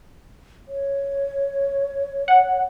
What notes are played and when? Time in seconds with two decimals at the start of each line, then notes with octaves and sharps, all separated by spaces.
0.68 C#5
2.28 F#5